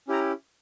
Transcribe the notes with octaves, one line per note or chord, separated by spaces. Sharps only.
C#4 E4 G4 A#5